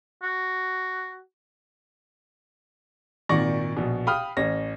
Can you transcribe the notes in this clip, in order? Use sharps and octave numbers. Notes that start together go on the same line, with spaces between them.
F#4
G#1 A#2 D#3 D5 C#6 A#6
A#1 B2
F5 G5 B5 D#6 F6
A1 C#5 A#6